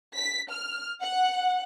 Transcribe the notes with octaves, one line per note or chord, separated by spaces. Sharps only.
B6
F6
F#5